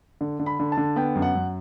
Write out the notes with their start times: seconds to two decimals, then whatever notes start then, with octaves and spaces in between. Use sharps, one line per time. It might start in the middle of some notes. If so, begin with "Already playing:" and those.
0.21 D3
0.40 D3
0.46 B5
0.60 D3
0.72 A5
0.78 D3
0.96 B3 G5
1.15 F#2
1.22 F#5
1.35 F#2